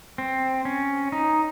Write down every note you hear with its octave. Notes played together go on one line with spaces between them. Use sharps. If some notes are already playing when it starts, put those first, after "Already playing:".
C4
C#4
D#4